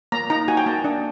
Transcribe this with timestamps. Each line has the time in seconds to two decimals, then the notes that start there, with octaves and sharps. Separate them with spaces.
0.12 A#3 A#5
0.30 D#4 A#5
0.48 F#4 G#5
0.57 G5
0.66 A#3 A5
0.84 D4